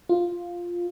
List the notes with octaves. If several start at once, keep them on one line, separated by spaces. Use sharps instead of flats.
F4